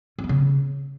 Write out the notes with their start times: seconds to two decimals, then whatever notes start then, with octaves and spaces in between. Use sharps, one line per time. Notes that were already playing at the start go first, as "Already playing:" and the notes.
0.19 C#4
0.24 B3
0.29 C#3